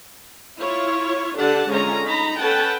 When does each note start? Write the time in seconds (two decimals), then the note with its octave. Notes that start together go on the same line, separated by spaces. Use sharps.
0.60 E4 F4 C#5
1.37 D3 D4 G4 A4 F#5 A5
1.69 D3 G#3 C#4 F4 C#5 A#5
2.05 D#4 A#5 B5
2.38 C#4 A4 B4 F#5 G5 A5